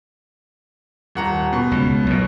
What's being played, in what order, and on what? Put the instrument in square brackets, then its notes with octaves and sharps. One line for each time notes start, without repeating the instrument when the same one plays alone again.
[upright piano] D#1 F#5 A#5
B2
[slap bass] C#2
B1 A#2